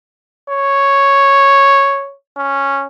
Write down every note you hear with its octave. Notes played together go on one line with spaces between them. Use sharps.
C#5
C#4